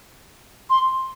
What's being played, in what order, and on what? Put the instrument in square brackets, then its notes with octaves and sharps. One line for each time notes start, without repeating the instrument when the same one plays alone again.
[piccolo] C6